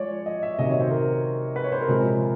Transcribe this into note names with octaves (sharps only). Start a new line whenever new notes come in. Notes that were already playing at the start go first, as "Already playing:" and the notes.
Already playing: F3 G#3 C#5 D5
D#5
E5
C3 D#3 F#3 D#5
C#5
C5
A#4
B4
C#5
C5
A#4
C3 F3 G#3